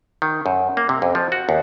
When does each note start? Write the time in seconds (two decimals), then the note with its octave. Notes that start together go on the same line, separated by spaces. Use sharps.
0.22 D#3
0.46 F#2
0.77 A#3
0.89 C3
1.02 F2
1.15 F3
1.32 F#4
1.49 D#2